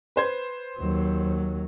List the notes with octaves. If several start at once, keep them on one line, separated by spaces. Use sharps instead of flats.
B4 C5 G#6
D#2 F#3